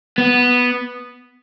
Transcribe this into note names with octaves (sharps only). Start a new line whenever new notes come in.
B3